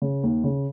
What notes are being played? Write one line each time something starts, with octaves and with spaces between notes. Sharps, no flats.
C#3
D#2
C#3